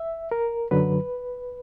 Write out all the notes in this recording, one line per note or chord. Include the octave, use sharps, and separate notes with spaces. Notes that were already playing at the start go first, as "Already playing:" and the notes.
Already playing: E5
A#4
F#2 D3 F#3 B4